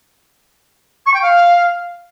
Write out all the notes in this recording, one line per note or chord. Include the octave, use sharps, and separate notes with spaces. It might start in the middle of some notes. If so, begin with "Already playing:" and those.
C#6
G5
F5